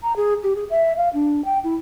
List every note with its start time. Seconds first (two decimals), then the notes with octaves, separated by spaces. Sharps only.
0.03 A#5
0.16 G#4
0.43 G4
0.56 G#4
0.70 E5
0.97 F5
1.13 D4
1.45 G5
1.64 E4